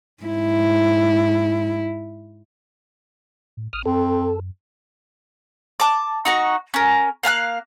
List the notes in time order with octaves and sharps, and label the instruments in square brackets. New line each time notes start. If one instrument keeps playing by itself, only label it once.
[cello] G#2 E4
[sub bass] A2
[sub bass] A1 [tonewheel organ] D#6 F6
[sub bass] F#2 [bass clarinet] C4 [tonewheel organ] A4
[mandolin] A5 D6
D#4 F#4 C#6
C#4 A#4
A#3 F5 G5 F#6